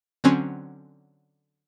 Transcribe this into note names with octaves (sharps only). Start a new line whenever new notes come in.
D3 F#3 C4 C#4